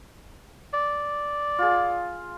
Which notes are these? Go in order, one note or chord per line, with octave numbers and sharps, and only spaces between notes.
D5
F4 G#4